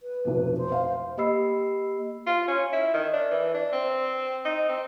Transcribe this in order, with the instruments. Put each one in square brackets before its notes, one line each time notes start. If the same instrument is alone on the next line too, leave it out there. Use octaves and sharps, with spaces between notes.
[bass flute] B4
[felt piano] F1 B1
[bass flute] C5
[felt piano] F5
[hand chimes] A#3 G4 D#5 B5 E6 C7
[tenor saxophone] F4
C#4
E4
D#3
D4
E3
D4
C4
D#4
C4